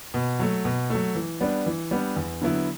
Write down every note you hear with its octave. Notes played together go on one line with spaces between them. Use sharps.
B2
F#3 A3
B2
F#3 A3
E3
G3 B3 D4
E3
G3 B3 D4
E2
D3 F#3 B3 E4